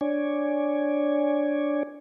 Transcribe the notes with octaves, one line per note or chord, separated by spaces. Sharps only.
D4 C#5 D5 G#5